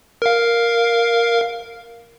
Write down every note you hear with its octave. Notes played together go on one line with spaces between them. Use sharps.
A#4 F5